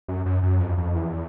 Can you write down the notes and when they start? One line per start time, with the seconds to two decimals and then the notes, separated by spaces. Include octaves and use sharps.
0.08 F#2
0.26 F#2
0.43 F#2
0.60 F2
0.78 F2
0.95 E2